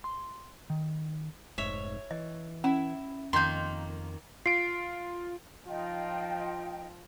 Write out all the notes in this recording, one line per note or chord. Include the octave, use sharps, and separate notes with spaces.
C6
D#3
F1 G#2 C#5 E5
E3 D#5
C#4 E4
F2 D#3 A#3 C6 G6
F4 C7 D7
F3 D#4 F4 D#5 G5